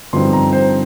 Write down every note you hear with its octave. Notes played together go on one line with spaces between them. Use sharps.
G2 D3 F3 C4 D#4 C6
A#5
C5